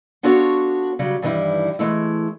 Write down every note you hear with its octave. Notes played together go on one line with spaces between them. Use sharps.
B3 D4 F4 F#4 A4 C#5
C#3 F#3 G3
G2 D#3 E3 G3 E4
E3 G#3 A3 E4